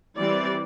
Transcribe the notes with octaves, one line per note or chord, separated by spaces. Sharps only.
E3 G3 C4 D5